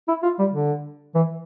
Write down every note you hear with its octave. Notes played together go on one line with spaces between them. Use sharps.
E4
F4
G3
D3
E3